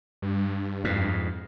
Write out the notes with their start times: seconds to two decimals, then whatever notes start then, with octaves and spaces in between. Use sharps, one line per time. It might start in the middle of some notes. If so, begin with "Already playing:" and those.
0.22 G2
0.84 F2 G#2